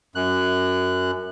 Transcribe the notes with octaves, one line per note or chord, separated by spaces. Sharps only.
F#2 F#6